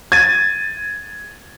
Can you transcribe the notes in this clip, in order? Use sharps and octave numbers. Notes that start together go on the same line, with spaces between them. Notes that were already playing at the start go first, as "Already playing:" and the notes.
G#6 A6 D#7